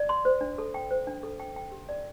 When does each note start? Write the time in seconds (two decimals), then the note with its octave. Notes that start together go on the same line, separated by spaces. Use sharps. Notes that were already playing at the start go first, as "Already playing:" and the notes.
Already playing: D5
0.09 C6
0.25 C5
0.41 D4
0.58 A4
0.74 G5
0.91 C5
1.07 D4
1.23 A4
1.40 G5
1.56 G5
1.72 G4
1.89 D5